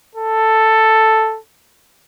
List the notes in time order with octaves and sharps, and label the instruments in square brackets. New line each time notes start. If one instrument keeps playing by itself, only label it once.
[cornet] A4